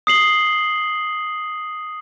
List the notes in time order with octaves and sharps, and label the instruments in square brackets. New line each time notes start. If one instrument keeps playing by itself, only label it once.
[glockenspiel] D#6 C7 F#7 G7